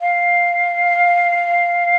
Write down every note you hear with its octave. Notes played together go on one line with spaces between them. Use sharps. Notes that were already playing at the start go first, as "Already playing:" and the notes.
F5